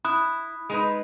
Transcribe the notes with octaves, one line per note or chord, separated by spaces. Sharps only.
E4 B5 D#6 F#6
G#3 D#4 B4